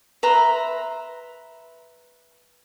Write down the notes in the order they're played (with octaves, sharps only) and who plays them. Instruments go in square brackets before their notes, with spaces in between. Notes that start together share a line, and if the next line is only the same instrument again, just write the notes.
[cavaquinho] B4 E5 A#5 C6